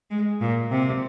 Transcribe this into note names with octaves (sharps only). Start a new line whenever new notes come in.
G#3
A#2
C3